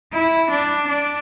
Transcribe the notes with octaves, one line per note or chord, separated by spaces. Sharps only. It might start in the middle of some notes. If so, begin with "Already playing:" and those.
E4
D4
D4